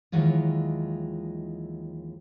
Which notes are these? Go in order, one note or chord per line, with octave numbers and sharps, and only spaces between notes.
D#2 D#3 E3 F#3 G#3 F4